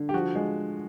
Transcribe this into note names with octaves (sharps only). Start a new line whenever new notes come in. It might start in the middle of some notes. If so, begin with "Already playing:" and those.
Already playing: D3
G4
F3 F#4
G#3